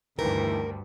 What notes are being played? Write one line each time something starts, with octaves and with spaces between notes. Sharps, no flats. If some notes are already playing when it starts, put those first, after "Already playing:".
D2 G2 D#3 E3 A#4